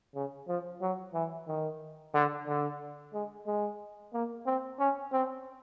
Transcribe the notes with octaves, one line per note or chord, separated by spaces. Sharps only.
C#3
F3
F#3
E3
D#3
D3
D3
G#3
G#3
A#3
C4
C#4
C4